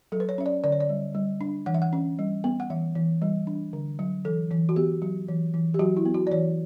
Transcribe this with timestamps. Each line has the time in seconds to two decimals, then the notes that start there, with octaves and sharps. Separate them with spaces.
0.12 F#3 A4
0.20 B4
0.29 C#5
0.38 C#4 E5
0.46 D5
0.64 D3 D5
0.72 C#5
0.80 D5
0.89 G3
1.15 G3
1.41 D4
1.66 E3 F#5
1.74 E5
1.82 F#5
1.93 C#4
2.19 G3
2.44 B3
2.60 F#5
2.70 E3 E5
2.95 E3
3.22 G3
3.47 D4
3.73 D3
3.99 F#3
4.25 E3 A4
4.51 E3
4.69 F#4
4.76 B3 G4
5.02 F#3
5.28 E3
5.54 E3
5.74 G4
5.79 F#3 F#4
5.97 E4
6.05 B3
6.14 F#4
6.27 D5
6.31 E3 C#5